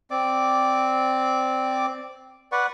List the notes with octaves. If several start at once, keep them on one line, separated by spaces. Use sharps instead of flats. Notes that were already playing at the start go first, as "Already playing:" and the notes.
C4 D5 D6
B4 D5 F#5 C#6